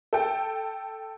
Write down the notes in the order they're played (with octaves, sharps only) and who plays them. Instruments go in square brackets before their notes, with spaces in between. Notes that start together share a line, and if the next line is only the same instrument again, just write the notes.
[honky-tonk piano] A4 G5